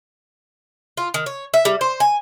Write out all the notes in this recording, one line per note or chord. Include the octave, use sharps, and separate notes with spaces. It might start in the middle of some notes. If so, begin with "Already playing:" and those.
F4
D#3
C#5
E5
G3
C5
G#5